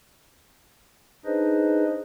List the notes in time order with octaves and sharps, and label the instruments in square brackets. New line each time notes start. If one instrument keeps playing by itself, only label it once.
[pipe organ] D4 D#4 G#4 B4 C5 D#5